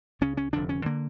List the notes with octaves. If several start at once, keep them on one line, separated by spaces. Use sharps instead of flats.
C#2 C#3 C#4
C#4
F1 F2 D3 D4
C#4
D3 A#3